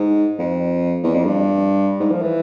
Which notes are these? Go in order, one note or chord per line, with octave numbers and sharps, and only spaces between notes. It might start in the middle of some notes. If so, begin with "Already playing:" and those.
Already playing: G#2
F2
E2
F2
G2
G#2
F3
E3